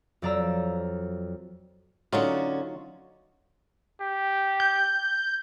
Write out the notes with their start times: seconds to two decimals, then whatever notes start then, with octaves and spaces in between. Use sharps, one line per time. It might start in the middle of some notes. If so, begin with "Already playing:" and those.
0.22 F2 F#3 D5 F5 A#5 E6
2.13 D3 F#3 C#4 D#4 F4 F#4
4.01 G4
4.60 G6